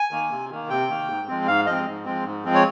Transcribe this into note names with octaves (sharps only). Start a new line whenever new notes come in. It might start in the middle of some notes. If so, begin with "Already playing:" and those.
Already playing: G#5
D#3 A#3
C3
D#3 A#3
C3 G5
D#3 A#3
G#2
F3 G#3 C4
G#2 F5
F3 G#3 C4 D#5
G#2
F3 G#3 C4
G#2
F3 G#3 C4
C#5